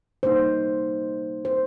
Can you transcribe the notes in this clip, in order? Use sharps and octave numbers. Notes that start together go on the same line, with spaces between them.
C3 G3 A#3 D#4 C5
C5